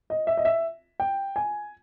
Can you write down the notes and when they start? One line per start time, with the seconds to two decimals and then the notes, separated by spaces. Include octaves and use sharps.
0.10 D#5
0.27 E5
0.37 D#5
0.45 E5
1.00 G5
1.36 G#5